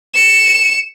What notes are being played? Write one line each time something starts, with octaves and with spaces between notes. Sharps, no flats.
C#7 E7